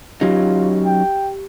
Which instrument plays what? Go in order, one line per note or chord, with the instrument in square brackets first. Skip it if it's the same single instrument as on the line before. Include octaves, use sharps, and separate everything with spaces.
[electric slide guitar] F#3 C#4 D#4 [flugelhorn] F4 [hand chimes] G4
[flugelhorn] G5